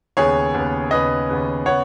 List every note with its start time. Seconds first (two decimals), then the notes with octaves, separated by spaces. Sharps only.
0.17 D#2 C#3 B3 G#4 C#5
0.54 D#2 C#3 B3
0.91 D#2 C#3 B3 B4 D#5
1.29 D#2 C#3 B3
1.66 C#3 B3 C#5 F#5